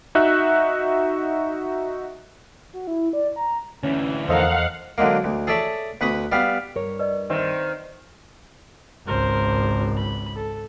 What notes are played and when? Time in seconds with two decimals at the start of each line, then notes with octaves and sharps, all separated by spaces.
0.15 D#4 F#4 E5 F#6
2.73 F#4
2.87 E4
3.13 D5
3.36 A#5
3.83 D2 E3 C#4
4.28 E2 F3 A4 A#4 C5 D#5 F5 F#5
4.98 D3 F#3 G#3 A#3
5.24 D2
5.47 G#4 A4 C#5 D5 E5 A5
6.01 D2 B4 B5 C#6 D#6
6.32 G3 B3 F5
6.75 G2 A#4 C#5
6.99 B4 D5 D#5
7.30 D#3 C4 B4 D#5 E5
9.07 G#1 C#2 A#4 C5
9.97 B5
10.35 A4